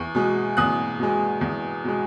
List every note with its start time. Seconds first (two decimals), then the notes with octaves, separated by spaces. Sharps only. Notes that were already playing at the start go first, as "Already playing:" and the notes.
Already playing: E2 C#6
0.15 B2 G#3
0.57 E2 D#6 F#6
0.99 B2 G#3
1.41 E2
1.84 B2 G#3